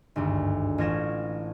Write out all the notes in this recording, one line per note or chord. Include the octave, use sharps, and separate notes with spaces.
G#1 D2 G2
A1 F4 C#5 A#6 E7